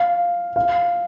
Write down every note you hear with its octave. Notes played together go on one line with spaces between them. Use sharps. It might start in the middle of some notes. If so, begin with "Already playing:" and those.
Already playing: F5
F5